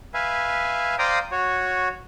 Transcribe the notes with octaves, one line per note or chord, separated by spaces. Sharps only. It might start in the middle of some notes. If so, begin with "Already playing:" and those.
B4 E5 F5 G#5
C5 D5 F5 G5 A#5 D#6
F#4 C#5